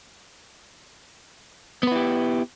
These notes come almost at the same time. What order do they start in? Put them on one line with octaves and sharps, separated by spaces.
B3 B4 E4 G4